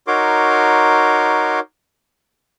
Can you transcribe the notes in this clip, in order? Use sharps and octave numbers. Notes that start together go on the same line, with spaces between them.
D#4 F#4 A#4 C#5 C6 D6